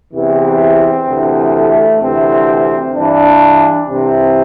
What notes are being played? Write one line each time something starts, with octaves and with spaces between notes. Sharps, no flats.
E2 C3 E3 C4
D2 C3 E3
A3
D2 C3 E3 C4
G2 E3 D4
C2 C3 E3 C4